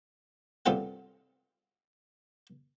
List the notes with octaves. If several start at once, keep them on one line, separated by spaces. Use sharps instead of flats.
C2 G2 C3 F4 A4 F#5